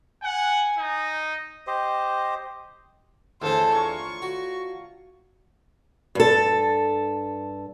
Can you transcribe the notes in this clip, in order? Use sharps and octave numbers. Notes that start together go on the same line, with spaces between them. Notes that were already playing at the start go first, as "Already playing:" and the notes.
F#5 G#5
D#4
G4 C5 D#5
E2 A2 D3 E3 A4 C5
F4 C#5 A#5 C#6
F#4
G2 A4